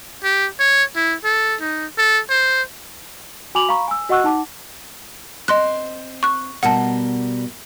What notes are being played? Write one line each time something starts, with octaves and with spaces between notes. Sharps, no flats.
G4
C#5
E4
A4
D#4
A4
C5
F#4 G#5 B5 D6 F7 F#7
F5 A#5 B5 C#6
G#5 E6
F#4 D#5 F#5 C#6 E6 F#6
D#4 F#5 A5 D6
C4 D#5 C6 F#6
C#6 F#6
B2 G3 A#4 F#5 A5